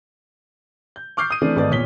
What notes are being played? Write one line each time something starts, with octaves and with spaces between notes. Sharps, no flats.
G6
C#6 D6 F6 G6 C7
D#6 D#7
E3 A3 C4 D4
G#1 A3 B4 D5 D#5
E2 A#2 C#5 B6 G7